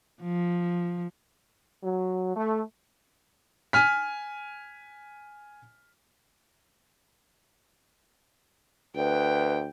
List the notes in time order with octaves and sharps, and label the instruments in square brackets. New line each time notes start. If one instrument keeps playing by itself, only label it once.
[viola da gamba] F3
[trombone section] F#3
A3
[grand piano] G#5 F6 B6
[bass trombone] D2 [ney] B4 [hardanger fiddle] G5